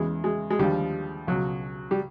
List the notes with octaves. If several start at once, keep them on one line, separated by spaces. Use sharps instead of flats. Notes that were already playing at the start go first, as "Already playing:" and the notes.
Already playing: E2 C#3 E3 G#3
G#3
G#3
D#2 D3 F3 G3
C#2 B2 F#3
G3